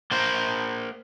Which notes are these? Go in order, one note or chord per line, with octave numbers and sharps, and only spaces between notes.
A#3 C5